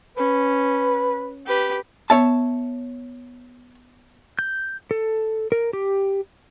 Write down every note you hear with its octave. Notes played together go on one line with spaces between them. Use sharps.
C#4 B4
G4 B4
B3 C#5 E5 A5
G6
A4
A#4
G4